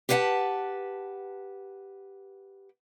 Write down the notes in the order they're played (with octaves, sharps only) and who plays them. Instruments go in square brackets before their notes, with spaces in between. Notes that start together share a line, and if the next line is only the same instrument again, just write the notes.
[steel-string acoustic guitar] G4 B4 C#5 F5 F#5 A5